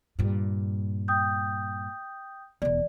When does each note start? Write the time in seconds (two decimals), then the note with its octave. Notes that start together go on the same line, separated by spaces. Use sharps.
0.19 G2 A#2
1.08 G5 D#6 G6
2.62 E1 E2 D5